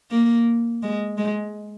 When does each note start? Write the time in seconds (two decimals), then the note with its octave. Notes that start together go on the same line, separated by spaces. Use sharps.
0.11 A#3
0.83 G#3
1.18 G#3